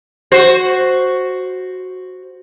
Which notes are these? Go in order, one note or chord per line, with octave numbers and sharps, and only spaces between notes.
F#4 C5